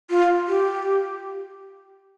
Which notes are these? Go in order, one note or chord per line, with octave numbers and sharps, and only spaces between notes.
F4
G4